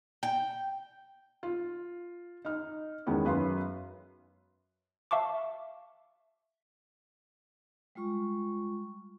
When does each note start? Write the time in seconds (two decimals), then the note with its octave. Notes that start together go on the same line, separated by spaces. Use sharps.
0.23 G5
1.43 F4
2.45 D#4 F6
3.07 E2 D#3 G#3 B3 C#4
3.25 F#2 B4 F5 C6
5.11 E5 F5 A5 C#6 D6
7.95 G3 G#3 F4 C#6